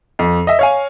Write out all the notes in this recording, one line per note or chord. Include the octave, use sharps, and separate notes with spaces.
F2
D#5 E5
C#5 F5 G#5